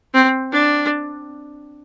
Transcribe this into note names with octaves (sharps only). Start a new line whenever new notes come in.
C4
D4